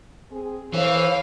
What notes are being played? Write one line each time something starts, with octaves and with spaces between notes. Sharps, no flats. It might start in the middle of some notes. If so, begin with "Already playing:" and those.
C4 G#4
E3 A4 C5 C#5 F5